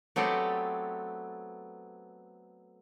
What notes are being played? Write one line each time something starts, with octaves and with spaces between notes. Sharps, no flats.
F#3 A3 B3 C4 G4 D5